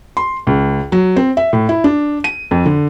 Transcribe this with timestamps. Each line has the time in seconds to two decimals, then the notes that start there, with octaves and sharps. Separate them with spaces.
0.17 C6
0.47 C#2
0.92 F#3
1.16 C4
1.37 E5
1.53 A2
1.69 E4
1.84 D4
2.24 D#7
2.51 F2
2.66 D3